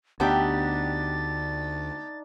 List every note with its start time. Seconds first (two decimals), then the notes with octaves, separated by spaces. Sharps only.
0.20 D2 B3 D4 D#4 G4 E5 A6